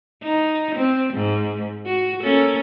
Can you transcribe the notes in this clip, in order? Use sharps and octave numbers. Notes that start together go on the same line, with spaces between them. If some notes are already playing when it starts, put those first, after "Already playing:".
D#4
C4
G#2
F#4
A#3 C#4 A4